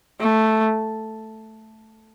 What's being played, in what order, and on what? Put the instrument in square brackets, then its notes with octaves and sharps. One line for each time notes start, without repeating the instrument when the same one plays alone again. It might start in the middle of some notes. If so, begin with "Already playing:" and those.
[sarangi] A3